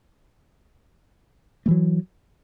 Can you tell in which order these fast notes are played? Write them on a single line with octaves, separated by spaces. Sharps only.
A3 E3 F#3